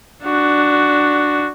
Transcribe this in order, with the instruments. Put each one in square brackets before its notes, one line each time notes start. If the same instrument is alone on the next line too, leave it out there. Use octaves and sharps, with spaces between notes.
[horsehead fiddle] D4 F#4